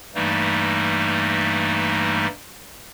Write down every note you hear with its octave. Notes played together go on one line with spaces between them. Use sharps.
G2 E3 G3 A3 A#3 D#4